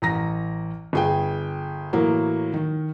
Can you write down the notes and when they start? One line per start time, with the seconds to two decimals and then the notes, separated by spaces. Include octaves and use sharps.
0.02 A1 A#5 A#6
0.93 G1 G#4 G5
1.93 A2 E3 F#3 A#3
2.54 D#3